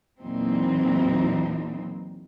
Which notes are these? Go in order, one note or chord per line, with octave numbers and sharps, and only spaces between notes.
E2 A#2 E3 F#3 C4 D#4